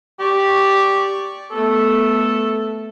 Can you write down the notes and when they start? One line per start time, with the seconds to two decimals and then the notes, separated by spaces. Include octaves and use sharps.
0.20 G4 D5 C#6
1.51 A3 B3 A4